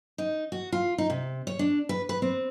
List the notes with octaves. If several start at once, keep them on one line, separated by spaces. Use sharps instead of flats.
D#4
F#4
F4
D#4
C3
C#5
D4
B4
B4
C4